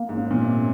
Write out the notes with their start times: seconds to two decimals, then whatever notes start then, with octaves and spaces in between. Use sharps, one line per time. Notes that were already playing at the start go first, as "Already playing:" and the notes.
Already playing: A#3
0.09 G#2
0.17 C#4
0.31 A#2
0.41 C3 C#4